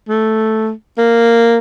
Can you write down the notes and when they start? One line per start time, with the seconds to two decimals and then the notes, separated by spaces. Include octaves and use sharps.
0.09 A3
0.98 A#3